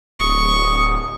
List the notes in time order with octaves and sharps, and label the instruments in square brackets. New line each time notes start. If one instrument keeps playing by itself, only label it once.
[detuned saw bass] D1 [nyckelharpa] C#6 [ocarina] D#6